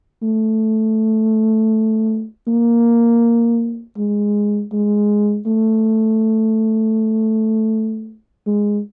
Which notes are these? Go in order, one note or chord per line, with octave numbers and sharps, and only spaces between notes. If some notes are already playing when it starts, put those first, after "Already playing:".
A3
A#3
G#3
G#3
A3
G#3